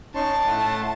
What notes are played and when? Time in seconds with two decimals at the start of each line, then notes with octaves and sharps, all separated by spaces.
0.15 C#4 D#4 A5 C6 C#6
0.47 A2 A3 F#5 C6